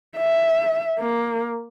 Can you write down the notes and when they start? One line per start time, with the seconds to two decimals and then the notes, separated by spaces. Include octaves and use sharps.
0.17 E5
0.99 A#3